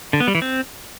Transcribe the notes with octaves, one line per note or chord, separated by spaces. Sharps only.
D3
B3
G3
E3
C4